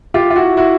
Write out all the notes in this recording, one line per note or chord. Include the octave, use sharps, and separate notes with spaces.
F4 G4
F4
E4 F#4
E4 F#4